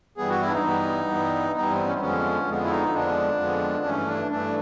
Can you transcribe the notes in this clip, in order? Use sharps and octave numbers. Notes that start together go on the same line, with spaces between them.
G2 E3 G3 B3 G#4
F#4
E4
D4
D#4
G2 E3 G3 B3
G2 E3 G3 B3
G2 E3 G3 B3 D#4
C4
C#4
C4
F2 D3 F3 G#3 B3 C#4
F2 D3 F3 G#3 B3
E4
D#4
F2 D3 F3 G#3 B3 D4
F2 D3 F3 G#3 B3
G2 E3 A3 C#4
D4
G2 E3 A3 D4